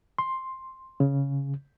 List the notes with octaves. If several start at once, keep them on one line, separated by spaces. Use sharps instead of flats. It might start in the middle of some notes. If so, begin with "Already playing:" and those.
C6
C#3